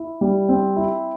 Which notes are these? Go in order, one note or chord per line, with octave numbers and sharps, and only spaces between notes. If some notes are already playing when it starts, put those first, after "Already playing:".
Already playing: E4
G3
C4
E4